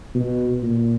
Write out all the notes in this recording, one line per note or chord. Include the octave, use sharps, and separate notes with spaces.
B2
A#2